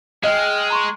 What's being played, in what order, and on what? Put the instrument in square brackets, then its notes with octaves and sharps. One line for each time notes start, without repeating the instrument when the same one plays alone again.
[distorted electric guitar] G#3 [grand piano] D#5 [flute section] G5 F6
[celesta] A#5 C6 C#6